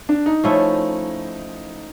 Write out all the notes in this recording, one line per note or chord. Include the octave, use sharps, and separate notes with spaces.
D4
D#4
F3 A3 C#4 E4